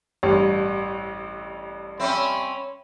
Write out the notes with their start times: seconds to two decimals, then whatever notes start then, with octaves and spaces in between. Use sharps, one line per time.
0.23 A1 G2 C#5
2.00 C4 C#4 E5 B5